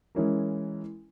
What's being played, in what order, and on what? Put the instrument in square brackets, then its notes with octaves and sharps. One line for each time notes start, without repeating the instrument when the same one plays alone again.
[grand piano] E3 G#3 C#4 E4 A#4